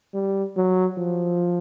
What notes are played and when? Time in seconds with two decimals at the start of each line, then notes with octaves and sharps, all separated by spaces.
0.14 G3
0.57 F#3
0.98 F3